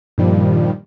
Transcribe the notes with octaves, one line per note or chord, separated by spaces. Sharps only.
G2 A#2 D#3 F3 G3